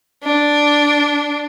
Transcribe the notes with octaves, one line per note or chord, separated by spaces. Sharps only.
D4